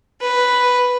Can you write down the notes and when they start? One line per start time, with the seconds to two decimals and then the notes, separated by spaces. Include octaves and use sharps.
0.22 B4